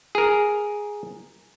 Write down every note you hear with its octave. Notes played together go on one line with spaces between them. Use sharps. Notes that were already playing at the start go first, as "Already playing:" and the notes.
G#4 A#4